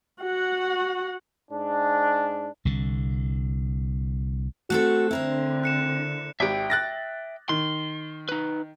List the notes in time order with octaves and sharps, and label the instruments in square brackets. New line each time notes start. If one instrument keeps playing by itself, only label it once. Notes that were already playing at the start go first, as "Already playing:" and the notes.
[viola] F#4 F#5
[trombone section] G#2 D4
[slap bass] C2 D3
[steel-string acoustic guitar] A3 C4 A4 [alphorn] F#4 [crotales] F#6
[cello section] D3 [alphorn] C4 [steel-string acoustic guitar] E4 A#4 C5
[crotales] F#6 C#7 E7
[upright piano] G#1 G4 [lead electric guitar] E5 G5
[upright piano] F#6 A6 A#6
[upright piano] D#3 [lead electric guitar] C6
[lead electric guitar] D#4 B4